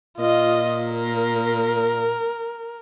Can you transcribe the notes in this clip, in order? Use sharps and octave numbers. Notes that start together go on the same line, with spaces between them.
A#2 F4 D#5
A#4